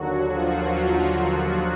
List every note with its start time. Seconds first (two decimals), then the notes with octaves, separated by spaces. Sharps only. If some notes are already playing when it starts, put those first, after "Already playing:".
Already playing: D#2 D3 F#3 F#4
0.34 F3 F4
0.74 F#3 F#4